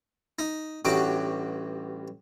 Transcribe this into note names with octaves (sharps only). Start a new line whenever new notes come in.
D#4
A1 G2 F#4 D6